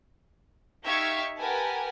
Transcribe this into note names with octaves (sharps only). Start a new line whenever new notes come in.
D#4 G4 E5 F5 C#6 G#6
G4 A#4 B4 F#5 G#5 A5